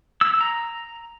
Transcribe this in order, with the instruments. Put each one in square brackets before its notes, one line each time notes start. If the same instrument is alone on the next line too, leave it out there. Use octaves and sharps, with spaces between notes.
[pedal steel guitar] E6
A#5